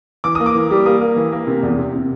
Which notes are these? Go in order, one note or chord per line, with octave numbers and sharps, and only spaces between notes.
E3 D6
A#3 D#6
D6
E3
G3
A#3 D#6
A#3
E3
A#3
C3
E2
C3
C3